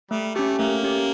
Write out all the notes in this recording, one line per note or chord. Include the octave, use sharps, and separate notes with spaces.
G3 A3
A3 C#4 G4
A3 A#3
C#4 G4